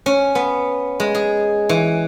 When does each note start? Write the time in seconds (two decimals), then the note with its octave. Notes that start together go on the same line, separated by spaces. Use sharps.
0.06 C#4
0.35 B3
1.00 G#3
1.15 G#4
1.69 E3